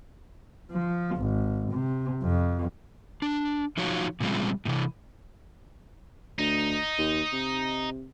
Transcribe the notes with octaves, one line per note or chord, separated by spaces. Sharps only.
F3
G#1
C3
F2
D4
F3 D#4 F4 F#4 C#5
A#2 C#3 F3 G3 G#3 C4
A2 C3 E3
D2 D#4
D#2
C3